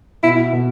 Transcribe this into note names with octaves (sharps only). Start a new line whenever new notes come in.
B2 E4
B2